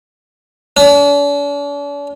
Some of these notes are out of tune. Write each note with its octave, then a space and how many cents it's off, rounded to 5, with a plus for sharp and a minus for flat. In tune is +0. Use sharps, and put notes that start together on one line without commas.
D4 -45